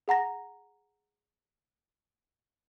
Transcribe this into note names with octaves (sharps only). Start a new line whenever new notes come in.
G#4 F#5 A#5 A#6